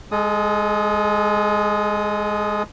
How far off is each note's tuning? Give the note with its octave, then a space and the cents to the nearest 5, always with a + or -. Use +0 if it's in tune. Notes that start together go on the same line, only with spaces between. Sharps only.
G#3 +0 A4 -40 D#6 +0